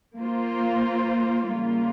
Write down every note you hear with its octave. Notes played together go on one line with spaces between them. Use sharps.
A#3 F4 C5
C#3 G3 A#3 F4